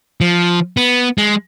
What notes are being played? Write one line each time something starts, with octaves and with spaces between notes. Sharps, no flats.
F3
B3
G#3